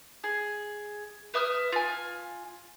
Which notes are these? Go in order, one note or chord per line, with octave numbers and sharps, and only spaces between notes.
G#4
B4 E5 D#6 F6
F4 G#5